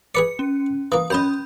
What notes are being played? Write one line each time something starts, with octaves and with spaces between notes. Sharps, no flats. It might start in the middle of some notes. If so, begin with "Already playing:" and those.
G#4 B4 D5 C#7
C#4
E3 A#3 D#6
F#2 C#4 D#5 B5 G6